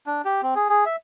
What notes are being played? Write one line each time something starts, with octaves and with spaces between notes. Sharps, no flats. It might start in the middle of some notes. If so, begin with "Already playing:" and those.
D4
G4
C4
G#4
G#4
E5